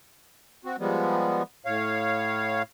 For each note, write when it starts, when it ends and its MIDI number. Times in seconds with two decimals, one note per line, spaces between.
0.65 0.76 60
0.65 0.76 66
0.79 1.43 53
0.79 1.43 55
0.79 1.43 56
0.79 1.43 59
1.66 2.62 45
1.66 2.62 73
1.66 2.62 77